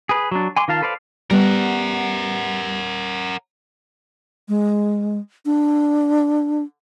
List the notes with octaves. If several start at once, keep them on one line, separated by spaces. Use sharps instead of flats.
G#4 B4
F#3 D4
G#5 C6 D6
D#3 F4 F5 A5
A4 B4 C5 D5 F5
G3 B3 A#4 F#5
G#3
D4